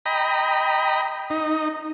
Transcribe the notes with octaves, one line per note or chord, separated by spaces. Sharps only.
D#5 G5 A#5 B5
D#4